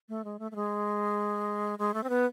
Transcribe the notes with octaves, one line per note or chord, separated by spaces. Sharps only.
A3
G#3
A3
A3
G#3
G#3
A3
C4
B3